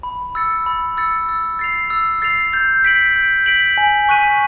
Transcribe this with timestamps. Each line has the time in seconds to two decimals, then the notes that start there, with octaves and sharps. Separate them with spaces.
0.03 B5
0.35 E6 A6 C#7
0.66 B5
0.97 E6 A6 C#7
1.29 E6
1.59 A6 C7 F7
1.90 E6
2.22 A6 C7 F7
2.53 G6
2.85 B6 D7 F#7
3.16 G6
3.46 B6 D7 F#7
3.78 G#5
4.09 C#6 F#6 B6 D#7